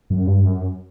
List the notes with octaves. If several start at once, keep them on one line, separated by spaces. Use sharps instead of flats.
F#2
G2
F#2